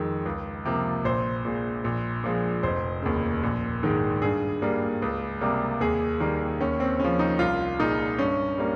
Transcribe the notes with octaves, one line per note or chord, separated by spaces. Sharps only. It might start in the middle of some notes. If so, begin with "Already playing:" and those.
Already playing: F2 D#3 G#3
C#2
C3 F3 A#3
A#1 C5
A#2 G#3
A#1
A#2 F3 G#3
F1 C5
D#2 C#3
A#1
G#2 D#3 G#3
G2 G#4
G3 A#3
C#2
C3 G3 A#3
D#2 G#4
D#3 G3 A#3
D#2 C#4
C4
C#3 F3 C#4
D#4
C2 F4
A#2 G#3 D#4
G2 C#4
G3 A#3